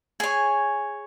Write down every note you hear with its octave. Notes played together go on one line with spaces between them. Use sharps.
G#4 C#5 G#5